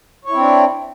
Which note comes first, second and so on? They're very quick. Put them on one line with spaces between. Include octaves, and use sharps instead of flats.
C#5 E4 C4 D4